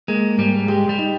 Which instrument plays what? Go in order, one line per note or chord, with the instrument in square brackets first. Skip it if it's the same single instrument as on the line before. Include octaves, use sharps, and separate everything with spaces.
[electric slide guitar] G#3 [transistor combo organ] A#3
[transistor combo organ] G#2 [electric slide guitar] G3
[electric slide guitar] G#3 [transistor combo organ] G4
[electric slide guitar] G3
[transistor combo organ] D#4